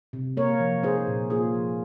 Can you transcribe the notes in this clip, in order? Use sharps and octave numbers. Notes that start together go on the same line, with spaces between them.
C3
A#3 A#4 C#5
F3
D#4 G#4 C5
A#2
A#3 F4 G#4
F3